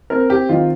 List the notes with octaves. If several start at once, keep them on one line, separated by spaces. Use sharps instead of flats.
C4 A#4
G4
D#3 F4